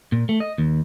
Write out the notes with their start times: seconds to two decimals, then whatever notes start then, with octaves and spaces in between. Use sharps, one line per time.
0.12 A#2
0.29 A3
0.40 D#5
0.58 D#2